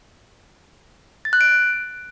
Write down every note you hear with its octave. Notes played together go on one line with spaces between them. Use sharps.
A6
F#6
D7